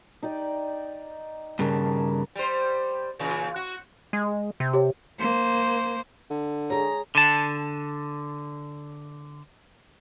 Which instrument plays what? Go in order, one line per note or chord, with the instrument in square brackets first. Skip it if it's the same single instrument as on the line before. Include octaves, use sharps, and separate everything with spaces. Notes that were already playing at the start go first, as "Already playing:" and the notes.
[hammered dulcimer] D#4 G4 D5
[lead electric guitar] G2 C#3 [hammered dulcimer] G#4 A#4 A5
[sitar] G3 C5
A#2 C#3 E3
F#4
[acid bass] G#3
C3
[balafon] G4 C#5
[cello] A#3 C5
[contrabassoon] D3
[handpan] G#4 C#5 [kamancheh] A#5
[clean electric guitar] D3 A5